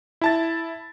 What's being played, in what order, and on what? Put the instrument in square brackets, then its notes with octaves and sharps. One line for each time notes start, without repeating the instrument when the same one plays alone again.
[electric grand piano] E4 A5 A6